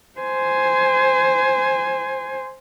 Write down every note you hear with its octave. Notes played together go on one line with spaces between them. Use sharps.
C5 G#5